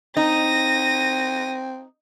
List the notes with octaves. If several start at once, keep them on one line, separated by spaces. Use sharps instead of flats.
C4 D#4 A#6 D#7